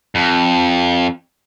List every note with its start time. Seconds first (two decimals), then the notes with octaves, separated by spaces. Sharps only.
0.15 F2